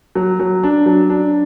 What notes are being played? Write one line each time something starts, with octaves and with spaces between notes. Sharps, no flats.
F#3
F#3
D4
F#3
D4